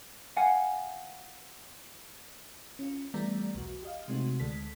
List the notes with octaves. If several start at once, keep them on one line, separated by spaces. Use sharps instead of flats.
F5 F#5 G#5
C#4 F4
E3 G3 A3 B3 D5 A#5
B1 E2 F#4
G4 D#5 F5
C3 G#3 A3 C4 D#4 F#4
D2 G#3 A4 B6